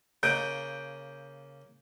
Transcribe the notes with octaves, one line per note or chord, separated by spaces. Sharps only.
C#3 A#3 D#6 G6 D7